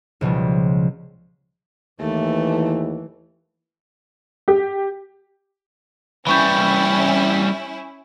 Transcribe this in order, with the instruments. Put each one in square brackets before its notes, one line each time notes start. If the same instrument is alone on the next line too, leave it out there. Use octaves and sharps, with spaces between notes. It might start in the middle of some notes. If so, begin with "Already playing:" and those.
[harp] C#2 B2 F3 G3
[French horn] D#2 [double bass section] E3 [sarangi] A3
[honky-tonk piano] G4
[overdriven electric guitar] E3 G3 [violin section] C#4 E4 [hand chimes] B5 C#6 G6